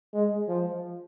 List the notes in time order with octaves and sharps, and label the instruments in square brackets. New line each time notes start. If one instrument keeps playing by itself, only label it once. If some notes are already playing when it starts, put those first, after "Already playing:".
[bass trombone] G#3
F3